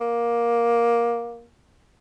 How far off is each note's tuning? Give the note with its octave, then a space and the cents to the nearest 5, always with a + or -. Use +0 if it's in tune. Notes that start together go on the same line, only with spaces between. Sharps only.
A#3 +15